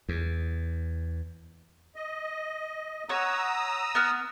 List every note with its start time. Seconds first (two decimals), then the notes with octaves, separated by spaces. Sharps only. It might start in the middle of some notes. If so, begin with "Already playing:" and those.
0.09 E2
1.96 D#5
3.09 C#5 F#5 A#5 D#6 E6
3.95 B3 F6